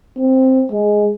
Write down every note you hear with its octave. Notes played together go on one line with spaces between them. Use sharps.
C4
G#3